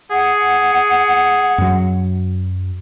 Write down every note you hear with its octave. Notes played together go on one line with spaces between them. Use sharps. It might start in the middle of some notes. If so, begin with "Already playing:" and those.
G#4 F#5
F#2 F#3